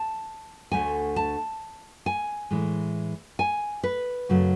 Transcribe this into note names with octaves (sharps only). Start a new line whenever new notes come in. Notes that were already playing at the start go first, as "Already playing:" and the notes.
Already playing: A5
D2 D3 A3 G#5
A5
G#5
A2 E3 G#3
G#5
B4
F#2 C#3 F#3 A3